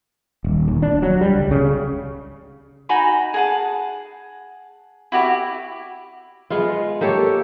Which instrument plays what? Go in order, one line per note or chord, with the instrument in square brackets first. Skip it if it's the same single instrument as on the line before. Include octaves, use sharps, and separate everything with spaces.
[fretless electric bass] D#1
D#2
D4
F#3
G3
C#2
C#3
[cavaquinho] D#4 F#4 G#5 B5
G#4 F#5 A5
E4 F#4 G4 E5
[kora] G#3 B3 F4
A#3 G4 A4 C#5